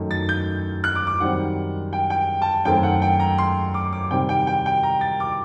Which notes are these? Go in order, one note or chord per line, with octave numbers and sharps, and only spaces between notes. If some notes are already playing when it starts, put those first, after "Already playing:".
Already playing: F#2 D#3 A3 D#4
A6
G6
F#6
D6
D6
F#2 D#3 G3 C4 F#5
G5
G5
A5
F#2 D#3 F#3 A3 C4 G5
F#5
G5
A#5
C6
D6
D6
C3 D#3 G3 C4 G5
G5
G5
G5
A#5
A6
D6